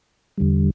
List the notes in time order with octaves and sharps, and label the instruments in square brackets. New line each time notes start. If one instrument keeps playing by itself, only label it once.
[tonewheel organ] E2 D3 G3